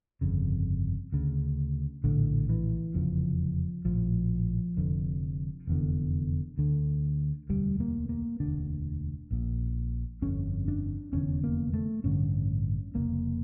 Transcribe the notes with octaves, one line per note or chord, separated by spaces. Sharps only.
G1 F2 C#3
D2 C#3
A#1 A2 D3
E3
F1 E2 C#3 F3
A#1 A2 F3
F1 F2 D3
F1 E2 D3
D2 D3
E1 D2 D3 G3
A#3
A#3
E1 D2 D3 D4
A#1 A#2
G1 F2 D3 C#4
D4
F1 E2 D3 C#4
A#3
A3
A1 G2 D3 C#4
F1 F2 C#3 A#3